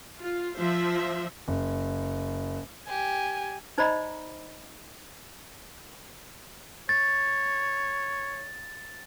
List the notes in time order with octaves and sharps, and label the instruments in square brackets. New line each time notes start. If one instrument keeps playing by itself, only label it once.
[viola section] F4
F3 C5 E5
[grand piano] F#1
[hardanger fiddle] G4 [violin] G#5
[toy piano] D#4 C5 D5 D#5 A#5 B5
[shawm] C#5 [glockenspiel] A6